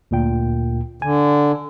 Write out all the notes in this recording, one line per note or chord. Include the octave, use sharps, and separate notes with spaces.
D2 A#2 G5
D3 G#5